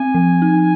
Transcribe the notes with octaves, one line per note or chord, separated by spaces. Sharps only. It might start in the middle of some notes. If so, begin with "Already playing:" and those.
Already playing: C4 G#5
F3
D#4